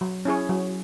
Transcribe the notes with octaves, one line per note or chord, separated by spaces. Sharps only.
F#3
C#4 E4 G#4 C#5
F#3